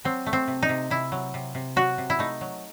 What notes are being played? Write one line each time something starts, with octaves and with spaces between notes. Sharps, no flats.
F#3 C4
A3
C4
C3
D#4
C3
C3 E4
F#3
C3
C3
F#3 F#4
C3
E4
A3 D#4
F#3